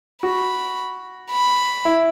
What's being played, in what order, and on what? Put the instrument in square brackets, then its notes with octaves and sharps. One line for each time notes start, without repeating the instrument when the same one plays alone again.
[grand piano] F#4 [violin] B5
[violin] B5
[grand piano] E4